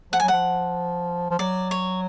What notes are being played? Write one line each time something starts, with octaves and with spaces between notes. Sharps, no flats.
F3 F#5
F#3 G#5
F3 F#5
F3
F#3 D5
C#5